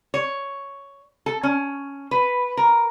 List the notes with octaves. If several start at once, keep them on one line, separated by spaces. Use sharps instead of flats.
C#5
A4
C#4
B4
A#4